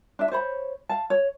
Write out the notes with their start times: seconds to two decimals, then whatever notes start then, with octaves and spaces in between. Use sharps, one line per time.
0.19 D4 E5
0.32 C5 C#5 B5
0.89 F5 A5
1.10 C#5